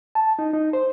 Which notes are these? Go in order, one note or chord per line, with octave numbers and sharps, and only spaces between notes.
A5
D#4
D#4
C5